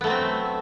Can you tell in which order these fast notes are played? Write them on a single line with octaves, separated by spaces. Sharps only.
B3 A3 F#3 C4